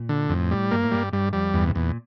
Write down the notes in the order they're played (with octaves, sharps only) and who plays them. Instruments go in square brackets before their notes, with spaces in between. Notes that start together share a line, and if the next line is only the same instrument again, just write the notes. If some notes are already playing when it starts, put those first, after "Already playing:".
Already playing: [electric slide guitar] A#2
[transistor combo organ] D3
[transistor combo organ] F2 [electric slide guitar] A2
[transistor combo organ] G3
[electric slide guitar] G2 [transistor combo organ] A#3
[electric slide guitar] A2
[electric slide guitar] G2 [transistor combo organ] G3
[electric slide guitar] G2 [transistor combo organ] G3
[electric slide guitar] F2 [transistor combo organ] G3
[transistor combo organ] E2 [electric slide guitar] G2
[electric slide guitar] C3
[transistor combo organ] E2 [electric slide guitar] A#2